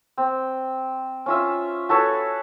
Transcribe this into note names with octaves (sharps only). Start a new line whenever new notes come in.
C4
C#4 F4 E5
F#4 A4 B4 C#5